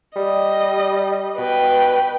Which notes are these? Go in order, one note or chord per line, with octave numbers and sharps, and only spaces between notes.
G3 D#5
B2 B4 G5